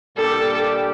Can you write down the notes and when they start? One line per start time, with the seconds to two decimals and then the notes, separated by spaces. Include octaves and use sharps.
0.17 A#2 G3 D4 G4 A4